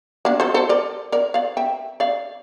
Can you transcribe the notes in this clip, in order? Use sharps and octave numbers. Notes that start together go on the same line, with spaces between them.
A#3 D4
A4 C5
A4 C5
A#4 D5
A#4 D5
D5 F5
E5 G5
D5 F5